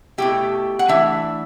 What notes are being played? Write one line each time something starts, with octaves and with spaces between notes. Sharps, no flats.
B2 A3 E4 G4
F#5
E3 A3 D4 E5